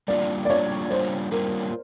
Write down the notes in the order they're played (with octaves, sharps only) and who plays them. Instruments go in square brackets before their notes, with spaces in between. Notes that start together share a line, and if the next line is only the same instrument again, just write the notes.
[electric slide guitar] G3 A#3 D4 F4 [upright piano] D5
[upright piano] D5
[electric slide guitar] G3 A#3 D4 F4 [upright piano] C#5
[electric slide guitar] G3 A#3 D4 F4 [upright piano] C5
[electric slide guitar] G3 A#3 D4 F4 [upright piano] A#4